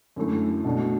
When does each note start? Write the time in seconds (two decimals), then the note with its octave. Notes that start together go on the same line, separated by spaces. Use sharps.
0.16 F#2 D3 A3 E4
0.65 B2 A3 D4